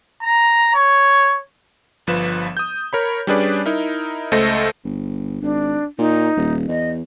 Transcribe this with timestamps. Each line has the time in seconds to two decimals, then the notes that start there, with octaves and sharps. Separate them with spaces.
0.23 A#5
0.74 C#5
2.07 G1 F3 B4 E7
2.57 D#6 G6
2.93 A#4 C#5 B5
3.27 G3 C#4 D4 G#4 B4 D5
3.66 D#4 E4 A#4
4.32 C#2 A3 C5 D#5 A#6
4.84 G1
5.42 G#1 D4
5.99 A#2 D#4
6.37 D#1
6.69 E2 D#5